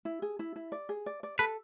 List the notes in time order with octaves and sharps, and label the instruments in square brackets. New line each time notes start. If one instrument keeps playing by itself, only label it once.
[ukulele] E4
G#4
E4
E4
D5
G#4
D5
D5
[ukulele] A4 [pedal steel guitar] B4